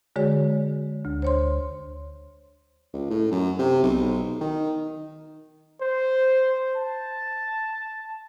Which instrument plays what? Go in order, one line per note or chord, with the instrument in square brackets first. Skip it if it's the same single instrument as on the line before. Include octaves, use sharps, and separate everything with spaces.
[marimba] D3 G#3 F#4 G#4 C#5
D2
C5 C#5 C6
[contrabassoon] C#2
A2
F#2
C3
B1
D#3
[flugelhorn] C5
A5